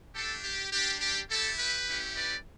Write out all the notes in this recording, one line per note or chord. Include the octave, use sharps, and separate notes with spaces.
A3 D4 G4 A4
G4
G3 D4 G4
G4
A3 E4 G4 A4
G4 B4
A3 C#4 E4 G4
B4 D5